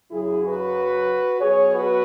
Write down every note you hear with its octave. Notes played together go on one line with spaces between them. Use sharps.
F#2 C#3 F#3 E4 G#4
F#4 B4
B2 F#3 G#4 C#5
F#4 B4